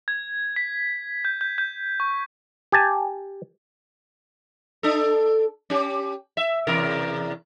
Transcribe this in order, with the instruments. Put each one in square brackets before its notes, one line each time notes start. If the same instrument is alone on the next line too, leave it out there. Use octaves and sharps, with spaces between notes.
[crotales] G#6
B6
G6
G6
G6
C#6
[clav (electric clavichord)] G4 G#5 A5
[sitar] D4 A4
C#4 G4
E5
E2 C3 A#4